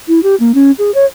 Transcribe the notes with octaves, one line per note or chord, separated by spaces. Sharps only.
E4
G4
A#3
C#4
G#4
C#5